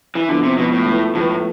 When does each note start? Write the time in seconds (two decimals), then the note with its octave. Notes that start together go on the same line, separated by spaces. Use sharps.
0.15 E3
0.29 D3 F3 B3 E4
0.43 C3
0.58 B2 F3 B3 E4
0.73 A2
0.86 F3 A3 E4 B4
1.15 A2 F3 A3 E4 B4